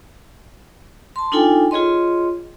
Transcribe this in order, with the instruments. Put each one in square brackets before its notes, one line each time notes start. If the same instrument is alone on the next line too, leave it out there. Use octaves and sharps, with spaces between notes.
[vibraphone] A5 C6
D4 D#4 F4 A4 G5 G#5
F4 G#4 C#5 D#5 C6